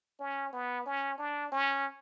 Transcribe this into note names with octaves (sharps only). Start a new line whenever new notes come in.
C#4
B3
C#4
D4
C#4